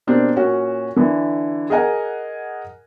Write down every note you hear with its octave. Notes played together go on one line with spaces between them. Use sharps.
B2 A#3 C4 D4 G4
A#2 C#4 F#4
D3 E3
G#4 A#4 D#5 F#5 G#5